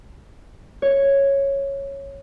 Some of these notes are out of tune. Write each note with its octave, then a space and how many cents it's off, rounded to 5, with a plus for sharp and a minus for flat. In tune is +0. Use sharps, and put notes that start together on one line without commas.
C#5 -5